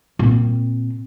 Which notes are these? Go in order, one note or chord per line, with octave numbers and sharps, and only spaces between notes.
A#2 C4